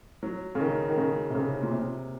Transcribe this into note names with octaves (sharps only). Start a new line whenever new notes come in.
F#3
C#3
D#3
D#3
C#3
C3
C#3
A#2
C3